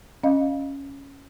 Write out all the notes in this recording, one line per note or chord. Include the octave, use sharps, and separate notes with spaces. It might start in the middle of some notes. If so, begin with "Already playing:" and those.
C#4 D#5 F5